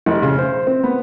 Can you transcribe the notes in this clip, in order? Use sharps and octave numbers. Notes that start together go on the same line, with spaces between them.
F1
C#3
C5
C4
B3